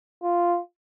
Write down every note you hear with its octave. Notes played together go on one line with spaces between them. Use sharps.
F4